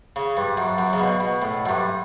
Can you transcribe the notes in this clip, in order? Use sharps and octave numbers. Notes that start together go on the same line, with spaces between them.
C#3
G2
F#2
F#2
C#3
B2
B2
A2
F#2
G2